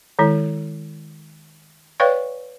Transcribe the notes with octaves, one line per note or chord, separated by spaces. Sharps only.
D#3 G#3 E4
B4 C#5 D5 F5 G5 C#6